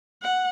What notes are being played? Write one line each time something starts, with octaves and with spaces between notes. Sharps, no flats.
F#5